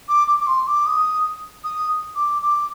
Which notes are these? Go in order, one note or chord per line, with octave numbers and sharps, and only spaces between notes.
D6
D6
D6
C6
D6
D#6
D#6
D6
D6